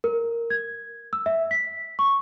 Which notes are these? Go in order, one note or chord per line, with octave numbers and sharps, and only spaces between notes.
A#4
G#6
E6
E5
B6
C#6